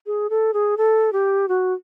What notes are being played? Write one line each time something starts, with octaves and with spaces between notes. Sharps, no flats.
G#4
A4
G#4
A4
G4
F#4